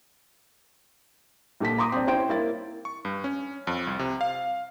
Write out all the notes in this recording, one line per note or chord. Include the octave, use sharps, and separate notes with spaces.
A#1 A#2 A4 B6
A#5 C6 D6 D#6
C4 D4
C#4 E4 C5 G5 C6 D7
A#3 E4 A6
C#6
G2
C#4
F2
C2
C3
F5